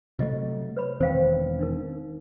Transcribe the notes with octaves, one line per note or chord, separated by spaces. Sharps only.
C3 F#3 A3 F4 D#5
B4 C#5 B5
E1 D#3 C4 C5 F5 G5
D4 D#4 A#4